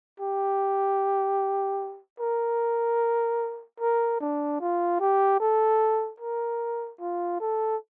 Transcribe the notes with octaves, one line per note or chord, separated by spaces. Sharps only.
G4
A#4
A#4
D4
F4
G4
A4
A#4
F4
A4